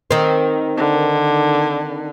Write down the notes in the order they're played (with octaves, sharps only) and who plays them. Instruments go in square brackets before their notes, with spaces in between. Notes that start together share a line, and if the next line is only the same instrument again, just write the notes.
[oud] D#3 C4
[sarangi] D3